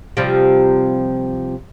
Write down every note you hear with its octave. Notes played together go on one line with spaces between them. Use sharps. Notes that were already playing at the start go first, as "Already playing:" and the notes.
C3 F3 G3